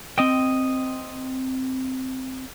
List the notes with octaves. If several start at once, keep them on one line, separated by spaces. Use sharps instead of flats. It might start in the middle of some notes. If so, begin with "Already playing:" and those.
C4 D#5 G5